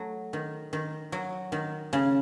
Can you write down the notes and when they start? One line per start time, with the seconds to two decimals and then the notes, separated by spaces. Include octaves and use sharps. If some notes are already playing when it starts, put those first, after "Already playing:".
Already playing: F#3 A3
0.33 D#3
0.73 D#3
1.12 F#3
1.52 D#3
1.93 C#3